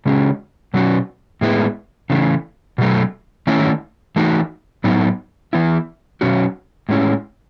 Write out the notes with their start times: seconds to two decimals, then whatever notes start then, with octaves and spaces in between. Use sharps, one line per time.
0.06 C#3 G#3 C#4 F#4
0.74 B2 F#3 C#4 F#4
1.41 A2 G#3 B3 E4
2.10 C#3 E3 A3
2.78 B2 F#3 A3
3.47 D#3 A3 C#4 E4
4.16 E3 A3 D#4 F#4
4.84 A2 F#3 B3 D#4
5.53 E3 B3 E4
6.21 B2 F#3 C#4 F#4
6.89 A2 G#3 C#4 E4